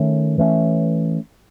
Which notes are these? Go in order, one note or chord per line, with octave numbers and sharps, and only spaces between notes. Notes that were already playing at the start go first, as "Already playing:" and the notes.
Already playing: D#3 A3 C#4
E3 A3 C#4